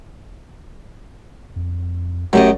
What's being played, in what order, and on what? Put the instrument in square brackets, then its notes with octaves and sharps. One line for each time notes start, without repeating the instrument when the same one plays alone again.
[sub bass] F2
[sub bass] G1 [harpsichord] F#2 [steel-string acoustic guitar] A3 G4 D#5